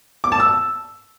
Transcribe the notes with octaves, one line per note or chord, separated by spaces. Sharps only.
D6
A5
E6